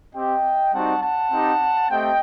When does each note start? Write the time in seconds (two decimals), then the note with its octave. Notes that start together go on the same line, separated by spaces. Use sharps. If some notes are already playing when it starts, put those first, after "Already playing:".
0.14 C4 G4 D#5 G5
0.73 G3 C4 D#4 F#4 F#5 A5
1.02 F#5 A5
1.31 C4 D#4 G4
1.90 A3 C4 G4 D#5 G5